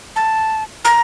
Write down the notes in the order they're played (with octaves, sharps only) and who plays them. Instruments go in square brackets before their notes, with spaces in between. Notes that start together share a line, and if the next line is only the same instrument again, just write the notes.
[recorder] A5
A#5